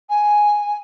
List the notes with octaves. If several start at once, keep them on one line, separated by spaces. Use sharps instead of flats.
G#5